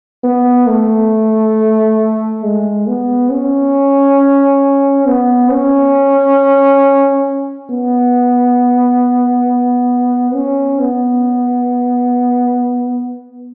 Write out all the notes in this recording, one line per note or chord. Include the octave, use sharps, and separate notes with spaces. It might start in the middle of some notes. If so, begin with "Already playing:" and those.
B3
A3
G#3
B3
C#4
B3
C#4
B3
C#4
B3